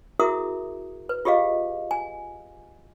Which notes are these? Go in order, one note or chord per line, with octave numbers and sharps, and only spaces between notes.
E4 F#4 G#4 A#4 E5 D#6
B4
F4 G4 G#4 D#5 F5
G#5